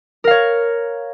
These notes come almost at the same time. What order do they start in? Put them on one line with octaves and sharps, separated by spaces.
A#4 F5 C#5